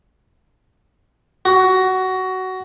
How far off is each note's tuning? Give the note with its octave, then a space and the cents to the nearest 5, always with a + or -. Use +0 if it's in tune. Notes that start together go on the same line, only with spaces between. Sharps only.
F#4 +15